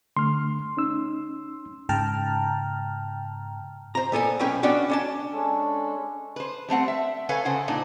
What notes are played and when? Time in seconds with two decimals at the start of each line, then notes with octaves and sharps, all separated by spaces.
0.16 D3 A3 C6 F6
0.77 C#4 D#4 E6
1.89 G#2 C#3 G5 A5 A#5 F6
3.95 C5 A#5
4.12 A#2 B3 A4 G#5
4.39 B1 A#2 C#4 G#4 B4 G5
4.63 B3 C#4 D4 F#4 D5
4.90 C#4 D4 A5
5.33 G#3 C#4 D4 A4
6.36 B4 C5
6.69 G3 A3 C4 F#5
6.88 E5
7.29 A4 B4 C#5 F5 G#5
7.45 C#3 A4 C5 F#5
7.68 A#2 D4 D#4